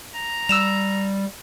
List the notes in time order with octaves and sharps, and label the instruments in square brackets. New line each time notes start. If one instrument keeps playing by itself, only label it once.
[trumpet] A#5
[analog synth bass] G3 [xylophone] E6 E7 F7